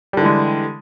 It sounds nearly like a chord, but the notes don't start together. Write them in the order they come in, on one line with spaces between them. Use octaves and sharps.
G3 D3 E3 G#3